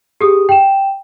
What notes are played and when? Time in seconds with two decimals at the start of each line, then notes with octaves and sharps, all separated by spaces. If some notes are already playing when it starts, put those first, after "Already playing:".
0.21 G4 G#4 D#6
0.49 G5 E7